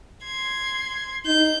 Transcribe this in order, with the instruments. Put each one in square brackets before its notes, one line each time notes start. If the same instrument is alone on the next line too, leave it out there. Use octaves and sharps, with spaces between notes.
[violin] C6 G#6
[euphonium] D#4 [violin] G6